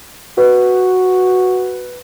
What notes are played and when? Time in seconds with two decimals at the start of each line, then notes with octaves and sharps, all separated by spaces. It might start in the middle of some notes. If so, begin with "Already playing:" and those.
0.38 F#4 B4